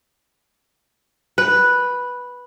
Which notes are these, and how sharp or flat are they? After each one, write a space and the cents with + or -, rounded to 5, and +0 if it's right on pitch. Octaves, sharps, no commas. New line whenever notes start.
B4 -5